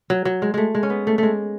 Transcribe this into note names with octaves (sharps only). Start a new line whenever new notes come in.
F#3
F#3
G#3
G#3 A3
G#3
C#4
B3
A3
G#3 A3